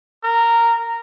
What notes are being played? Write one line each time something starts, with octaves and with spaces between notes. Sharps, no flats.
A#4